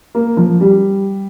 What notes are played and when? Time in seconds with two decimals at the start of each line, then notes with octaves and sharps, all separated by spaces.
0.15 A#3
0.37 F3
0.61 G3